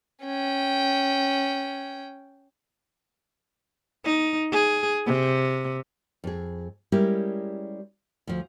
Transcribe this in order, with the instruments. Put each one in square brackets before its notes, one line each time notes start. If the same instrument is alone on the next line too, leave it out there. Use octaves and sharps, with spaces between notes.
[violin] C#4 G5
[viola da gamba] D#4
G#4
C3
[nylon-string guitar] F2 G#4
G3 G#3 C#4 E4 G4 A#4
D2 F3